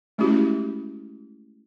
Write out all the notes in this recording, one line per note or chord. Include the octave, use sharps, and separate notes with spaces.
G#3 A3 C#4 E4 F#4 G4